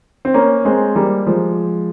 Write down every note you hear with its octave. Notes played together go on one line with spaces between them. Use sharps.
C4
A#3 C#4
G#3 C4
G3 A#3
F3 G#3